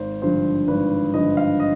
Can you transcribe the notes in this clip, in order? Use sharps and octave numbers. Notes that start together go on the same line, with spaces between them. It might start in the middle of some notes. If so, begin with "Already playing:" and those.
Already playing: G#1 C5
G2 D3 F3 C5
G#1 B4
G2 D3 F3 D#5
F5
D#5